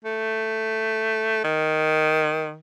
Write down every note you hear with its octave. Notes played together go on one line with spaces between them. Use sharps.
A3
D#3